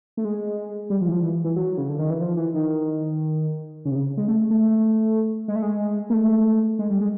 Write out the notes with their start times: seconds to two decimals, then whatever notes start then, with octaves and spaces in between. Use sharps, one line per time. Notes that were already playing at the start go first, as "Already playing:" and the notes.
0.17 A3
0.25 G#3
0.90 G3
1.01 F3
1.08 E3
1.12 F3
1.23 E3
1.44 E3
1.56 F#3
1.78 C#3
1.89 D3
1.99 D#3
2.10 E3
2.21 F3
2.37 E3
2.54 D#3
3.85 C#3
3.91 C3
3.95 C#3
4.17 G#3
4.28 A3
4.50 A3
5.48 G#3
5.56 A3
5.62 G#3
6.10 A#3
6.13 A3
6.79 G#3
6.90 G3
7.01 G#3